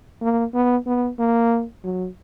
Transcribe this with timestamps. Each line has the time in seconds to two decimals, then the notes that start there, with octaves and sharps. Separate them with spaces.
0.22 A#3
0.54 B3
0.86 B3
1.19 A#3
1.84 F#3